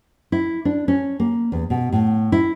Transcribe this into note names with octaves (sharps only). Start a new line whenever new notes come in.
E4
D4
C#4
A#3
E2
B2
A2
E4